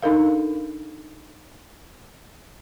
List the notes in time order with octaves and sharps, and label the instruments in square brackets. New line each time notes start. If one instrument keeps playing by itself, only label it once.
[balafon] D4 D#4 A4 A#4 F5